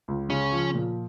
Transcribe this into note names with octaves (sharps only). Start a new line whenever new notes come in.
C#2
C#3 C#4
F3
A#2